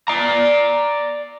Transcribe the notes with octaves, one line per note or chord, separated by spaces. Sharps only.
D5 A#5